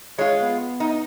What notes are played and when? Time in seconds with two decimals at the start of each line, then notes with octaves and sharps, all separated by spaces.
0.19 G#3 F4 C#5
0.42 B3
0.80 D#4